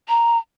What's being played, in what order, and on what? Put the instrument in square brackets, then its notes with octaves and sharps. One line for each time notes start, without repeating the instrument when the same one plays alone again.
[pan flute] A#5